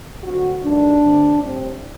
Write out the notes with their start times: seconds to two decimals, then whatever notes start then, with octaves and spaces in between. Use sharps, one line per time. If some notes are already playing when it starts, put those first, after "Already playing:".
0.24 D2 D3 F#3 C4 F#4
0.63 G2 D#3 A3 D4
1.00 G2 D3 A3 C4
1.40 A2 G3 C4